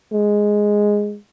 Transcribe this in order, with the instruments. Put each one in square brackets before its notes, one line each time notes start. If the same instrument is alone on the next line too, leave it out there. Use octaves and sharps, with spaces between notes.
[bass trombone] G#3